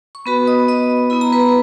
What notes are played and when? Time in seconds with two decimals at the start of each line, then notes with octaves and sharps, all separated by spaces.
0.15 C#6
0.26 B3 F#4 B4 B5
0.47 D#5 D#6
0.68 D#5 D#6
1.10 B3 E4 B5
1.21 A#5
1.32 B4 B5